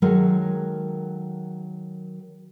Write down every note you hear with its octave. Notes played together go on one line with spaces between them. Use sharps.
D#3 F#3 G#3 A4 A#4